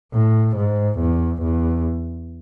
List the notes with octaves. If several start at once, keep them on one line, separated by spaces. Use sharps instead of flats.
A2
G#2
E2
E2